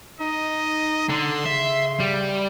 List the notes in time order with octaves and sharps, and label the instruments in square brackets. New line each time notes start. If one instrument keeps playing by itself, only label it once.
[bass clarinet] D#4 [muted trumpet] D#5
[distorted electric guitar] D3 [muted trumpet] C6
[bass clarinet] C#3 [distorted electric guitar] E5
[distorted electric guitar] G3